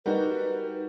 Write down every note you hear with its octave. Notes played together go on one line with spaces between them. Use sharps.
G3 D#4 F#4 A#4 B4